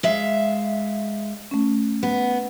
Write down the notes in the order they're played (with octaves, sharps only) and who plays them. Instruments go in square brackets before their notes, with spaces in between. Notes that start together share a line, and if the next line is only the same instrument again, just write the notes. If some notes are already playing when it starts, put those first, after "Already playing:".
[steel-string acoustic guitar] G#3 E5 F5
[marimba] A3 C#4
[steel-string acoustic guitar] B3